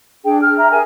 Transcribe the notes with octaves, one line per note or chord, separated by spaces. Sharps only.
D4 G#4 G5
F6
E5 A#5
G#4 A#4 G#5